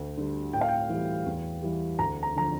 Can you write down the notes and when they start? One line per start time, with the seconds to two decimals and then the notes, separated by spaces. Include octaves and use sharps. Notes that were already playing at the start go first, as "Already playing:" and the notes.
Already playing: D2
0.17 D3 G3
0.53 A2 G5
0.61 F5
0.69 G5
0.90 E3 G3
1.26 E2
1.62 E3 G3
1.99 D2 A#5
2.23 A#5
2.36 D3 F3 A#5